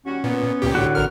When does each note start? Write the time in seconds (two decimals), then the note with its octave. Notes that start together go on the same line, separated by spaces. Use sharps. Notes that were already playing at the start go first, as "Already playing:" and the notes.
0.06 D#2 G3 C#4 F#4
0.24 A#2 B3
0.62 C#2 A#2 G4
0.75 A2 D3 F#4
0.95 A1 F2 B2 A#4 F6